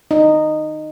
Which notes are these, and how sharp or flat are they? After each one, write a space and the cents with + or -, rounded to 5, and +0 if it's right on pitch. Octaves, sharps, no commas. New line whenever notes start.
D#4 -15